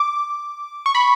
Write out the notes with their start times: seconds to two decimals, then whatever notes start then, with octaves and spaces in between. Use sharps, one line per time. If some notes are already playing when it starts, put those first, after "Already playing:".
Already playing: D6
0.86 C#6
0.95 B5